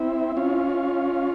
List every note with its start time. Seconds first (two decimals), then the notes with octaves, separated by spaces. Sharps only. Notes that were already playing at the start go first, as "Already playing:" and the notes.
Already playing: C4 E4
0.37 C#4 F4